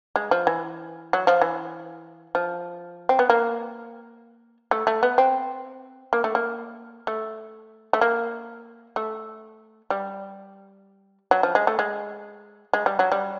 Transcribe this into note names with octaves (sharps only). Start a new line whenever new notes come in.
G#3
F3
E3
F#3
F3
E3
F3
C4
B3
A#3
A3
A3
B3
C4
A#3
A3
A#3
A3
A3
A#3
A3
G3
F#3
F3
G#3
A3
G#3
G#3
G3
F#3
G3